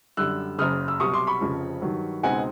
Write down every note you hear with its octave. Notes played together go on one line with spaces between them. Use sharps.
F#2 D3 G3 E6 F#6
F#1 F#2 C#3 D#6 F6
E6
C2 B2 F#3 C#6 D#6
C6 D6
B5 C#6
F1 F2 C#3 F3
G2 D#3 F#3
C#2 B2 G#3 C4 D#4 F#5 G#5